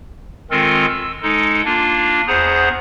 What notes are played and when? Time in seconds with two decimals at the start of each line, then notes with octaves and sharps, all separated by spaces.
0.51 D#3 G#3 C4 F4 A4 A#4
0.89 E6
1.22 G#3 D#4 A4
1.65 A#3 D4 F4
2.28 E2 G#4 C5 F#5 A#5